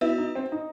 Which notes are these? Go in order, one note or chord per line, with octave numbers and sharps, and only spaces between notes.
B3 E4 F#4 B4
D#4
C4
D#4